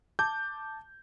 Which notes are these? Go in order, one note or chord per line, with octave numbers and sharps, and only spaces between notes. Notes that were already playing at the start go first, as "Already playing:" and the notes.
A5 D6 G6